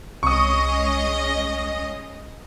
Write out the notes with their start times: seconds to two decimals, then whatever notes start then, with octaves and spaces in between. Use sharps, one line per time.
0.23 C2 G#3 C#4 D#5 C#6 D#6